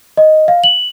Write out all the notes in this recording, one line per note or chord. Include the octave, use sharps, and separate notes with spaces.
D#5
F5
F#7